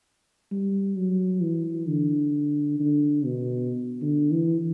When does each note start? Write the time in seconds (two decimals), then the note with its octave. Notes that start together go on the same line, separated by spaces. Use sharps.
0.51 G3
0.96 F#3
1.42 E3
1.88 D3
2.80 D3
3.25 B2
4.02 D3
4.31 E3